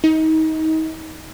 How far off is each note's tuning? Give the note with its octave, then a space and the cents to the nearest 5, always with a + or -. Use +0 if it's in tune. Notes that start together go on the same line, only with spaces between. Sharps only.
D#4 +30